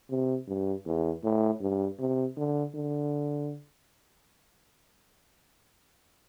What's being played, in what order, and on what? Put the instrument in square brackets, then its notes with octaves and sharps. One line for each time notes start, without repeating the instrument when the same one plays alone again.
[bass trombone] C3
G2
E2
A2
G2
C3
D3
D3